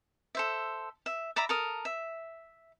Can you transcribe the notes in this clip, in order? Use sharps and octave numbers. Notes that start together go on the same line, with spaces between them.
A4 C5 E5
E5
D5 E5 A#5 B5
A4 A#4 D#6
E5